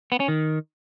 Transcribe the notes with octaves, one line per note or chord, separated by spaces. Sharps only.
B3
C#4
D#3